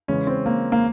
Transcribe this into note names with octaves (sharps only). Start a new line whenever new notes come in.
C#3 E3 G#3 C#4
C4
A#3
A#3